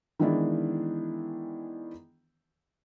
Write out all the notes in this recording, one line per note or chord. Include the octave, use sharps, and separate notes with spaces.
D#3 E3 G#3 B3 D4 E4